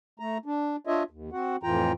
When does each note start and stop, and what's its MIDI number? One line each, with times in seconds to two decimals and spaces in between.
0.20 0.38 57
0.20 0.38 82
0.46 0.76 62
0.87 1.03 62
0.87 1.03 65
0.87 1.03 73
0.87 1.03 75
0.87 1.03 76
1.10 1.30 39
1.32 1.56 60
1.32 1.56 66
1.32 1.56 78
1.63 1.92 41
1.63 1.92 45
1.63 1.92 52
1.63 1.92 65
1.63 1.92 79
1.63 1.92 82